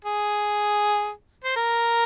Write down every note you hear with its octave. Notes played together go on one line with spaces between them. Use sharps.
G#4
C5
A#4